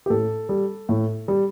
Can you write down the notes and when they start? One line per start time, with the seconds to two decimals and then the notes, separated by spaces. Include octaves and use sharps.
0.06 G4
0.10 A2 A4
0.49 G3
0.89 A2
1.28 G3